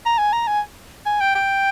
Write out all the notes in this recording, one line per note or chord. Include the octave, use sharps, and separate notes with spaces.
A#5
G#5
A#5
G#5
G#5
G5
G5